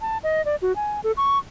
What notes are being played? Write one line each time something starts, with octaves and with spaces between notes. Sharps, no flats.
A5
D#5
D5
F#4
G#5
A4
C#6